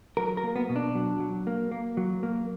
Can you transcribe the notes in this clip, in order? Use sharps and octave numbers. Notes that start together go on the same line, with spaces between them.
F#3 A#4
A#4
A#3
B3
B2
D4
F#3
F#3
A#3
A#3
F#3
A#3